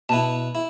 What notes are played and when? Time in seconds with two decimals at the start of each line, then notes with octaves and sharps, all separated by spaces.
0.09 B2 B3 E4 A5
0.55 E4